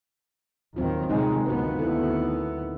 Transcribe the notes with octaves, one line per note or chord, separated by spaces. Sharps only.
D#2 D#3 F#3 C4 F4
C3 D#3 G#3 D#4
D2 D#3 A#3 B3 F#4 B4
E4 A4